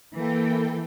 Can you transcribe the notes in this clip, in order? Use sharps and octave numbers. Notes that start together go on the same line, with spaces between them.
E3 A#3 A4 G5